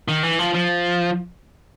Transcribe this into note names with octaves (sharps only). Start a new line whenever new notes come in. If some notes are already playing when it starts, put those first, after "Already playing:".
D#3
E3
F3
F3